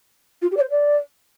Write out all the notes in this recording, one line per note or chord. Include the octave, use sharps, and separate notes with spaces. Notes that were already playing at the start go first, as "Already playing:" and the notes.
F4
G4
D5
C5
D5